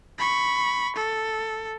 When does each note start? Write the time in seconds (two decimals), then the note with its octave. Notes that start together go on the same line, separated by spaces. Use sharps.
0.18 B5 C#6
0.96 A4